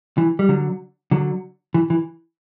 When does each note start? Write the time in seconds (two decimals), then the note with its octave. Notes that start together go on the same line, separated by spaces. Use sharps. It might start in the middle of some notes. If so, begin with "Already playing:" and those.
0.18 E3
0.39 G3
0.49 D3 F#3
1.11 D3 F#3
1.74 E3
1.90 E3